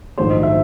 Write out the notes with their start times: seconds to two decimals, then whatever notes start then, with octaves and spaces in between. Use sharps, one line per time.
0.18 A#1 G#2 D#3 F#3 A3 C5
0.30 D#5
0.43 E5